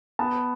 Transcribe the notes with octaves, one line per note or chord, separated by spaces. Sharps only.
B3 A5